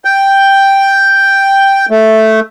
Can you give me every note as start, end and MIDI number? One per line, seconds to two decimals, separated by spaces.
0.05 1.86 79
1.90 2.40 57